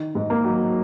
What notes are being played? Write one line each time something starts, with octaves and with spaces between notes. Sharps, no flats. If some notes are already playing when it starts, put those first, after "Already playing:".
Already playing: D#3
G#2
A#3
F#3